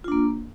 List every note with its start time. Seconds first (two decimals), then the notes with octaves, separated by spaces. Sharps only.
0.04 F4
0.08 D4
0.12 A#3